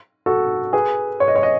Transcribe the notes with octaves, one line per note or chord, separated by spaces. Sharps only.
F#4 A4
G#4 B4
C#5
D#5
C#5
D#5